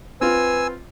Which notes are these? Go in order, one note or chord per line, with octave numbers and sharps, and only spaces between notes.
C4 F4 B4 G#5 E6